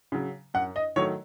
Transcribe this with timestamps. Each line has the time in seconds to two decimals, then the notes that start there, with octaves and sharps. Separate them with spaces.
0.12 C#3 F#3
0.54 F#2 F#5
0.76 D#5
0.96 D#3 F#3 A3 C#5